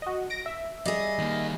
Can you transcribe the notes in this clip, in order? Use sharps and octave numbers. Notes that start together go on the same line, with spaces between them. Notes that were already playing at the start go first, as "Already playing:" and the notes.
F#4 D#5
A#6 D7
E5
G3 G#4 D#5
D#3 A#3